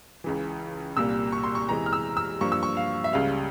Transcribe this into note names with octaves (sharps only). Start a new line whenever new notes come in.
C#2 C#3 E3
C2 A#2 G3 A#3 E6
C#6
C6
C#6
E2 C3 E3 G#3 A#5
F6
E6
E6
G2 F3 A#3 C#6
E6
C#6
F5
E5
C#2 C#3 G3 F5